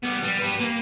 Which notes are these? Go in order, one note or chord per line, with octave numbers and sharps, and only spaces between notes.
G3 B3
G3
G4 B4
A#3